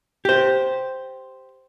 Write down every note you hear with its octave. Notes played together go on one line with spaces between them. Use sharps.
G4 C5